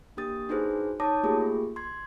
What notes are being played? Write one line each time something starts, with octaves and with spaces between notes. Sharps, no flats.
A#3 D4 G4 D#6 A6
D4 D#4 F#4 G#4 B4 C5
D#4 C#5 A5 D6 D#6 A#6
A3 A#3 F4 G4 G#4
C6 G#6